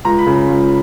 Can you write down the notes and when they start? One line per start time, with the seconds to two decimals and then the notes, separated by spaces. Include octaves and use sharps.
0.05 C#2 A#5
0.19 B5
0.27 C#3
0.48 C#2